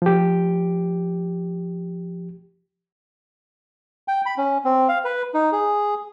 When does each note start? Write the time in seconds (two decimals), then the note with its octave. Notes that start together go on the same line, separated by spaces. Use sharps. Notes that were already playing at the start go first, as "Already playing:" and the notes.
0.02 F3 G4
4.08 G5
4.26 B5
4.37 C#4
4.65 C4
4.88 F5
5.05 B4
5.34 D#4
5.52 G#4